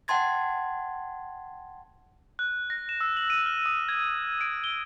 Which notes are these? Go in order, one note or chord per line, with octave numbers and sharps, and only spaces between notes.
F#5 G5 A5 C6 G#6 A6
F#6
A#6
E7
E6
F#7
D#7
F6
D#6
G#6
D7
G7